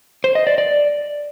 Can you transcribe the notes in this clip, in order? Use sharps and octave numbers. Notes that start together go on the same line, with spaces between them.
C5
D#5
D5
D5